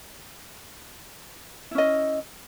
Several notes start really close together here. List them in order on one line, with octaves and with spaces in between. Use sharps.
E4 C#4 D#5